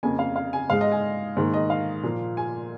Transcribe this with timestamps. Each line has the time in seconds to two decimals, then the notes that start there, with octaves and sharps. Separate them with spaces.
0.03 F2 C#3 A#3 G#5
0.19 F5
0.36 F5
0.53 G#5
0.70 G#2 G#3 F5
0.81 D#5
0.92 G#5
1.37 G#2 D#3 A#3
1.54 D#5
1.70 F5
2.03 A#2 F3 A#3
2.37 G#5